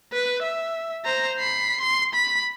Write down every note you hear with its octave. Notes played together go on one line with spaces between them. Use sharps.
B4
E5
C5 A#5
B5 C7
C6
B5